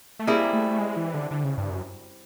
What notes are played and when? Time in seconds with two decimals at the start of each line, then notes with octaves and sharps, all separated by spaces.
0.19 A3
0.27 G3 A#3 C4 E4 G#4
0.53 A3
0.78 G#3
0.97 E3
1.14 D3
1.31 D3
1.44 C#3
1.58 G2
1.70 F#2